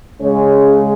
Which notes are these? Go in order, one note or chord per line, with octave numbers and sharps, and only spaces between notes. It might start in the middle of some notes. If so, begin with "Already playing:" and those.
C#3 G#3 C#4